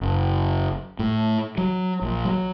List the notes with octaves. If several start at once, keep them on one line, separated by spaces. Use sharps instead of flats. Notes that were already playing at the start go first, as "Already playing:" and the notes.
F#1
A2
F#3
A#1
F#3